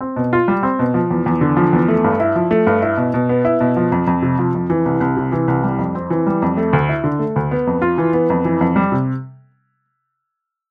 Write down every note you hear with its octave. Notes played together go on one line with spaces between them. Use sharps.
C4
B2
F4
G3
C4
B2
F3
E2
E2
D3
F3
E2
A3
G2
E4
F3
A3
G2
E4
B2
B2
B3
E4
B2
F3
F2
F2
C3
F3
F2
E3
C2
C2
C3
E3
C2
G3
F2
C4
E3
G3
F2
A3
D2
E4
D3
A3
D2
B3
F2
F4
E3
B3
F2
E3
F2
G3
C3